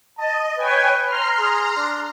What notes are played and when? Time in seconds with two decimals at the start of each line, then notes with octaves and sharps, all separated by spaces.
0.17 D#5 A5
0.57 B4 C#5 G5 G#5
1.06 A#5 C6 F6
1.39 G#4
1.76 D4